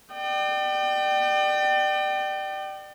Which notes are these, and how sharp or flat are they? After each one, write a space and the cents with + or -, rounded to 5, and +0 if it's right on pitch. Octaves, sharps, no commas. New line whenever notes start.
D5 +35 G5 -25